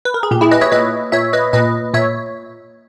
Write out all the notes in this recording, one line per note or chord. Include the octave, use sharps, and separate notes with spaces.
B4
A#4
G#4
A#2 G4
E4 G#4
B4 D#5
C#5 E5
A#2 B4 D#5
A#2 C#5 E5
B4 D#5
A#2 B4 D#5
A#2 C#5 E5